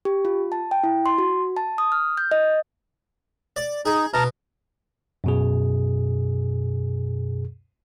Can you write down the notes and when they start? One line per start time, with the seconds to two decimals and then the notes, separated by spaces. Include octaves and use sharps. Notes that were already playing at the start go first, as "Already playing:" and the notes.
0.05 G4
0.25 F4
0.52 A5
0.71 G5
0.83 E4
1.06 C6
1.18 F#4
1.57 A5
1.78 D#6
1.92 F6
2.17 G6
2.31 D#5
3.56 D5
3.86 D#4 G#4
4.14 B2 A5 A#5 F6
5.24 F#2 B2 G#4